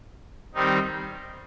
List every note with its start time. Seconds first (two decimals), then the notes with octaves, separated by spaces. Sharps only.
0.54 D#3 G3 C4 D#4